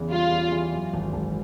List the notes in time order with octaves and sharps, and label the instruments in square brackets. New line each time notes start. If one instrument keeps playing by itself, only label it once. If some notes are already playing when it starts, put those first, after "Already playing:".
Already playing: [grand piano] E2 C#3 E3
[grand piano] G3 [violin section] F4
[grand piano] E2
E3
F#2
G#1
G#1